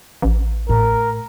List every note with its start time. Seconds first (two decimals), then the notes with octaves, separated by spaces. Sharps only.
0.22 A1
0.69 A2 A#4